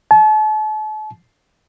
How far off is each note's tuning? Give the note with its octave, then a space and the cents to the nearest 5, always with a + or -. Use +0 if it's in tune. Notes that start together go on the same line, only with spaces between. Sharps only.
A5 -40